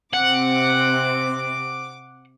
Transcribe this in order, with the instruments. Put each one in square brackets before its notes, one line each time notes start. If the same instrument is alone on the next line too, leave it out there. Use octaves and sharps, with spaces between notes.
[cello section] C3 C4 [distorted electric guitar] F#5 [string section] D6